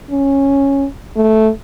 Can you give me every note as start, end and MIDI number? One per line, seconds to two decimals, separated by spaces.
0.11 0.86 61
1.16 1.49 57